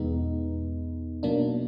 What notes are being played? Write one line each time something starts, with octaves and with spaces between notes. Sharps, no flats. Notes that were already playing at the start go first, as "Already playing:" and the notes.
Already playing: E2 B2 G#3 B3 D#4
B2 F#3 A#3 D4